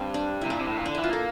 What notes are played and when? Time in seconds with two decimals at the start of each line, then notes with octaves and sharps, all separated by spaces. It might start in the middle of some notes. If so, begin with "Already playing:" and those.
Already playing: G2 C4
0.14 D4
0.41 C3 E4
0.50 A#2 D4
0.59 C3
0.68 A2
0.76 A#2
0.86 D3 D4
0.95 E3 E4
1.04 F4
1.09 A#3 A4